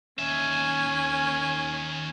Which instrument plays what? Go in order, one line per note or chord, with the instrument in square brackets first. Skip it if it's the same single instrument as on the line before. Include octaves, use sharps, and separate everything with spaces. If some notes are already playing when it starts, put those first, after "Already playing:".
[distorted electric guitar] D#2 E5 [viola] C#4 G#5